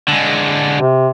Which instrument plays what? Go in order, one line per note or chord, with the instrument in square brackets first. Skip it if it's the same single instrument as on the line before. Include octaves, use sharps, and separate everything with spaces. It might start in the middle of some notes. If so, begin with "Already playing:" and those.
[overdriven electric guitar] D3 G#3
[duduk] C3